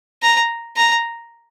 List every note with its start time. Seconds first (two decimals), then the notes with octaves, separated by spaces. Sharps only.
0.22 A#5
0.77 A#5